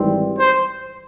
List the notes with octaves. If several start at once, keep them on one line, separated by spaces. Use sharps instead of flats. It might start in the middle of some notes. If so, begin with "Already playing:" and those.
Already playing: G#1 G#2 E3 G3 C4
C5